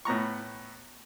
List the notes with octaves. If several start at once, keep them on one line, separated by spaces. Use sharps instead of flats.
A2 B3 A#5 C#6